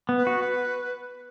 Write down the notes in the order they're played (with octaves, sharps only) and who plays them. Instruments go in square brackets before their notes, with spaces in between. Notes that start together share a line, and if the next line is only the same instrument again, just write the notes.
[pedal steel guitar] B3
[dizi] B4
[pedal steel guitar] F#4